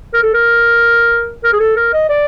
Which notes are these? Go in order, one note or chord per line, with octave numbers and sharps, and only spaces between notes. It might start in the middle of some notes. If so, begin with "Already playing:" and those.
A#4
A4
A#4
A#4
G#4
A4
A#4
D#5
D5